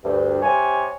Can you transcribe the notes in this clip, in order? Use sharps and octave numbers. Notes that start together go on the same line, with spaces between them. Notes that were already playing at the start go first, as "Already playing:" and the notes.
D2 G2
C3 C#5 G#5